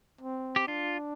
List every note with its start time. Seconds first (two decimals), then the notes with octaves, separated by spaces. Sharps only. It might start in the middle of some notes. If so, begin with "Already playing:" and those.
0.21 C4
0.56 G4
0.67 D4 F4